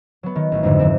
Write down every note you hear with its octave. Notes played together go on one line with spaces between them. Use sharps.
F#3 B3
D#3
A1
G#1 F2 G#2 D3
G#2 E3 C4